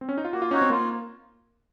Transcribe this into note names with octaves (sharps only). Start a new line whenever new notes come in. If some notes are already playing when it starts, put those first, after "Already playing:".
C4
C#4
D#4
F4
A#3 F#4
F4
C#4 D#4 F#4 C#5
C4
A#3 F4